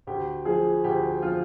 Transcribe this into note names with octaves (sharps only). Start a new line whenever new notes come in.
D2 G4
F3 G#4
D2 G4
F3 F4